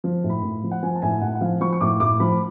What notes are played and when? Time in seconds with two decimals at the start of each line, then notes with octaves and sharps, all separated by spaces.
0.04 F3
0.24 A2
0.30 B5
0.43 A2
0.63 F3
0.71 F#5
0.83 F3 G#5
0.95 A5
1.02 A2 G#5
1.22 A2 F#5
1.35 F#5
1.41 F3 F5
1.60 F3 C#6
1.73 C#6
1.81 A2 D6
2.00 A2 D6
2.20 F3 B5